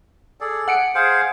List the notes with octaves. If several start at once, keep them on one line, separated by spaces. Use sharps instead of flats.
G#4 A4 D5
F#5 C#7 D7
G#4 C5 F5